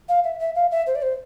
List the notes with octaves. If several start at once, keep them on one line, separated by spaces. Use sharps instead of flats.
F5
E5
E5
F5
E5
C5
D5
C5